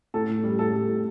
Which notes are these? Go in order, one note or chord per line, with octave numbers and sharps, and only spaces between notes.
A2 A4
A2
G3
A2 A4
G3
A2